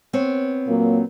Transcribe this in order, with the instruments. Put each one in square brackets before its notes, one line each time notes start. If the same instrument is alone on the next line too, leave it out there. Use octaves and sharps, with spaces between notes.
[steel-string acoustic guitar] B3 C4 C#5
[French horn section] A#2 F#3 A#3